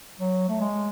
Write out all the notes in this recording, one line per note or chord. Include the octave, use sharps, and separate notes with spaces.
F#3
A3
G#3